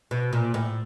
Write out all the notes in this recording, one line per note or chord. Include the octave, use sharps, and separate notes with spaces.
B2
A#2
A2